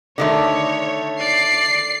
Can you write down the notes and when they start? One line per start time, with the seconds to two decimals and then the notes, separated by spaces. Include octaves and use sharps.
0.18 D3 D#3 A3 C#5
1.19 D5 C7